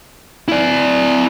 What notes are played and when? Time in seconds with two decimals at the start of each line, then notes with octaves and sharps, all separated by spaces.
0.48 E4 D5